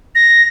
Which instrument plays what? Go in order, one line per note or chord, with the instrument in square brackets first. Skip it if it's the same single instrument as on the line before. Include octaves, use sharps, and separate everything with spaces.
[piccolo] A#6